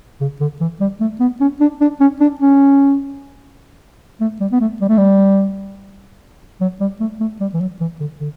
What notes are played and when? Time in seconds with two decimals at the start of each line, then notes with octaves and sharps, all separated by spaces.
0.21 C#3
0.41 D3
0.61 E3
0.81 G3
1.00 A3
1.20 B3
1.41 C#4
1.61 D4
1.81 D4
2.00 C#4
2.21 D4
2.41 C#4
4.21 A3
4.40 G3
4.52 B3
4.61 A3
4.81 G3
4.89 A3
4.98 G3
6.61 F#3
6.80 G3
7.00 A3
7.20 A3
7.40 G3
7.54 E3
7.60 F#3
7.81 E3
8.00 D3
8.20 D3